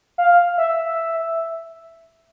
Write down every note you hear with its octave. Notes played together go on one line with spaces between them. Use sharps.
F5
E5